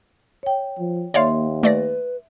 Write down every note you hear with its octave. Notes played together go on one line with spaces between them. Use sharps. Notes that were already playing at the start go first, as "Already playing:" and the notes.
C#5 G5
F3
D#2 A#3 C#5 D5 E5 F5 C6
A3 B4 D5 A#6